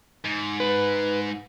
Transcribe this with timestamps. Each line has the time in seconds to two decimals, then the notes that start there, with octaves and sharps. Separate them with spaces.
0.24 G#2
0.60 B4